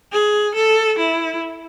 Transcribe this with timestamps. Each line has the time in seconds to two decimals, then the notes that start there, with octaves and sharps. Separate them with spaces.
0.13 G#4
0.55 A4
0.99 E4